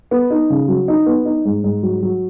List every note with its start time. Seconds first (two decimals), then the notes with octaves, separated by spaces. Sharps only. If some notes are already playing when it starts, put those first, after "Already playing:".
0.11 B3
0.30 D#4
0.50 C#3
0.68 F#3
0.88 D#4
1.06 B3
1.26 D#4
1.45 G#2
1.64 G#2
1.83 F#3
2.03 F#3